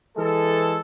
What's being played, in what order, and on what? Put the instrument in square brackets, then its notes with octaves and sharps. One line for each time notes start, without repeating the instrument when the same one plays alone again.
[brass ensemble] E3 G#3 A4